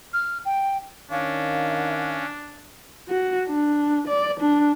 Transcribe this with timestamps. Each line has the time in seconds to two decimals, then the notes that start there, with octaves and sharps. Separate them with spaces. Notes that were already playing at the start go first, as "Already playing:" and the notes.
0.13 F6
0.45 G5
1.11 D#3 C#4 D4 F5
3.09 F#4
3.48 D4
4.08 D5
4.40 D4